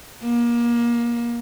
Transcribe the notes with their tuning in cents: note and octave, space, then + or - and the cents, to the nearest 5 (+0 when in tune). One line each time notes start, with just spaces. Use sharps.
A#3 +25